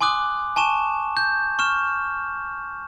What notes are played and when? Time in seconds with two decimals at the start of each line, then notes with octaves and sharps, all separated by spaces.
0.01 G#5 C6 D6 D#6 F#6
0.56 G#5 A5 C#6 E7
1.17 G6
1.59 C#6 F6 E7